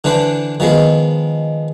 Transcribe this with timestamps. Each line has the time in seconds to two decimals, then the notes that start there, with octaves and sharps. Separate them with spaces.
0.04 D3 E3 D4 B4 C5
0.60 D#3 F3 G#3 B3